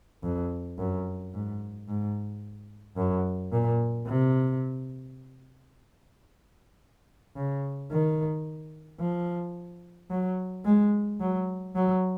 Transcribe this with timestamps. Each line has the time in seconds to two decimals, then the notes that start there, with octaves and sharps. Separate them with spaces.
0.23 F2
0.78 F#2
1.33 G#2
1.88 G#2
2.97 F#2
3.52 A#2
4.07 C3
7.36 C#3
7.91 D#3
9.00 F3
10.10 F#3
10.65 G#3
11.20 F#3
11.75 F#3